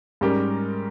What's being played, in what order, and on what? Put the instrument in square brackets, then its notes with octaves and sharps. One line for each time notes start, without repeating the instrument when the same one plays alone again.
[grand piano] G#2 G3 C#4 G4 A#4